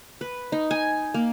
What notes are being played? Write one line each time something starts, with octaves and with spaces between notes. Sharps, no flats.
B4
D#4
G#5
A#3